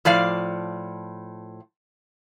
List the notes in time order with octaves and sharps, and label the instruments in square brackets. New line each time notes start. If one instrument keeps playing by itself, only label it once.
[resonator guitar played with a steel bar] A2 F3 D5 F5